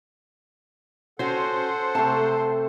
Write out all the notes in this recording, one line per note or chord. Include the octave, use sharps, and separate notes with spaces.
C#4 F#4 A4 C5 F#5
C3 A3 A5